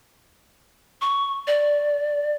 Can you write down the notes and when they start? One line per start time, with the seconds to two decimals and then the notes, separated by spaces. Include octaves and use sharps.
1.01 C#6
1.47 D5